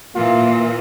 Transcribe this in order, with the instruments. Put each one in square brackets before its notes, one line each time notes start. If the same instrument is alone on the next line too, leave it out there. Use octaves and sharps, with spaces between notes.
[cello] A#2 E3 [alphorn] A#3 [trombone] F4